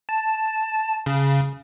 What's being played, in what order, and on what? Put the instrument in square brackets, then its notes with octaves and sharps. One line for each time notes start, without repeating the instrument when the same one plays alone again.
[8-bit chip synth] A5
C#3